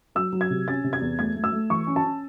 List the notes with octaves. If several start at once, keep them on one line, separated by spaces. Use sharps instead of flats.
F#3 E6
F#3
G#6
C3
C#4 A6
C3
G#6
E2
A3 G#6
A3
E6
A3
E3 C#6
C#4
A5
C#4